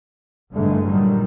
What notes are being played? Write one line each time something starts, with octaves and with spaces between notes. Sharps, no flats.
A1 G2 D3 D#3 G#3 A3
A#2 D#3 F#3 G3